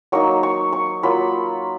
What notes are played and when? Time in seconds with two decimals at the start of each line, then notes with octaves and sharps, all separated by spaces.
0.12 F#3 A#3 D#4 C#6
0.43 C#6
0.73 C#6
1.03 F#3 A#3 F4 B5